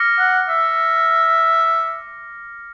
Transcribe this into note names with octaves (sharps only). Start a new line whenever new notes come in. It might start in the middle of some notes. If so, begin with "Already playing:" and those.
Already playing: D6 F6 A#6 C#7
F#5
E5